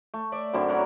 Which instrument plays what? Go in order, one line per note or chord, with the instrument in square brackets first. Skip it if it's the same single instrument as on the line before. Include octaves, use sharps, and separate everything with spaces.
[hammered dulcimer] A3
D5 E5
F#2 D3 C4 E4
F#3 A#4 F#5